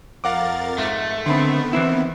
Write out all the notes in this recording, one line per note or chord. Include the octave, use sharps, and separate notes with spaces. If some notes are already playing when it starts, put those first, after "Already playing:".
F2 A#4 F5 F#5 D6 A6
G#2 A3
D3 D#3 B3 C4 B5 C6
E3 C4 E4